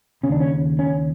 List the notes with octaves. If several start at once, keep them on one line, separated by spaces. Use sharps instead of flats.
D#2 C#3 C#4 D4
C#4
C#4